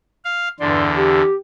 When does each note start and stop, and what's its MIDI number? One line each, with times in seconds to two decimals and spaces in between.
0.25 0.48 77
0.60 1.22 40
0.60 0.86 43
0.60 1.22 50
0.60 0.86 74
0.60 0.86 84
0.96 1.35 67